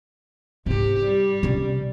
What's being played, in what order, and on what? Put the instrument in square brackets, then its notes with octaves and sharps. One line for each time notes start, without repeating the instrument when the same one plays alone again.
[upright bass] G#2 E4 [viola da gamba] C3 G4
[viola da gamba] G3
[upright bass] C3 C#4